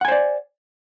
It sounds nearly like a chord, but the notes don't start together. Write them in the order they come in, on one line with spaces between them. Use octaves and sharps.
F#5 G#5 C5 D5